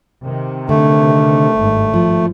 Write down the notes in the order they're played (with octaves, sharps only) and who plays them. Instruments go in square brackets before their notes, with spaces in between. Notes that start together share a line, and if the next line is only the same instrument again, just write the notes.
[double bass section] C3 D#3
[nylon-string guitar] D3 [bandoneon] A3
[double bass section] G#1 G2
[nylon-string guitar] F3